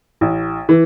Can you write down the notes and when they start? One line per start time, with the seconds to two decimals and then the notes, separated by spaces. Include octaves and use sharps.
0.21 A1
0.69 E3